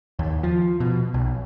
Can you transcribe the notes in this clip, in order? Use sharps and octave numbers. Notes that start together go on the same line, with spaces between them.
D#2
F3
B2
B1